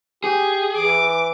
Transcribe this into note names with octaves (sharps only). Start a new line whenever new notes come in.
G4 G#4
E3 D6